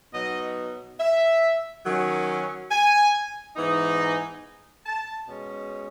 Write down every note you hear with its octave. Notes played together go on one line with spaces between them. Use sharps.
B2 F#3 B3 D#4 D#5
E5
D#3 F#3 C#4
G#5
G#2 E3 B3 D#4
G#5
A5
B2 G#3 C#4